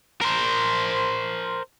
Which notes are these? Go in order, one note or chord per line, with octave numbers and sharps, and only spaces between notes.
A#4 C5